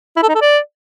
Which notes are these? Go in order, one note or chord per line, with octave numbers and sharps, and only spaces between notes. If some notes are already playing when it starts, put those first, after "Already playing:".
E4
A4
D#4
A4
D5